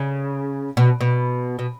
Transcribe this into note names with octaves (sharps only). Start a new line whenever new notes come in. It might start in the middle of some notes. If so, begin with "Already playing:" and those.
Already playing: C#3
B2
B2
B2